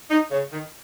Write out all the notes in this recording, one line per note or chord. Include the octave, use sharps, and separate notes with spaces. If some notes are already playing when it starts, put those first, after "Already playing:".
D#4
C#3
D#3